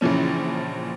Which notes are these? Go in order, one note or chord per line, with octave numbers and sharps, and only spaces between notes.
A#1 C#3 E3 F3 C#4